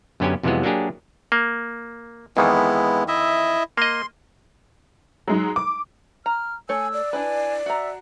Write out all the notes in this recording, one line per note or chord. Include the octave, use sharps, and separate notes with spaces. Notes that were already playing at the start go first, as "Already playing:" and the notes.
F#2 D3 B3 C#4 G4 G#5
F2 C3 E3 F#3 G#3 B3
F#3 A#3 D4 G4 G#4
A#3
F2 D#3 E3 G#3 B3 E4
E4 D#5 E5
A#3 D#5 C6
F#3 G#3 D#4
D6
A#5 F6
A3 C#5 G#5 E6
D5
D4 E4 B4 G#5
F#4 E5 A#5